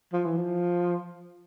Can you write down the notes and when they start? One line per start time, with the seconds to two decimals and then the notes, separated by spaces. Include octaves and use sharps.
0.13 F3
0.25 E3
0.37 F3